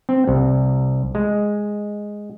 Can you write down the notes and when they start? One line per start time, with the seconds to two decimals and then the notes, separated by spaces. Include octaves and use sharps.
0.09 C4
0.27 C2
1.15 G#3